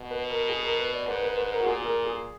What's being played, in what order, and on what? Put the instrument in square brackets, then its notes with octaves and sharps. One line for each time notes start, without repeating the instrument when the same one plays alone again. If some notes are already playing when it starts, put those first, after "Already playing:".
Already playing: [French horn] B2
[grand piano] B4
A#4
G#4
A#4
B4
D5
[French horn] G#2 [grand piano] B4
[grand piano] B4
B4
A#4
F#4
[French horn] A#2 [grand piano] G#4
[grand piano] G#4
A#4
G#4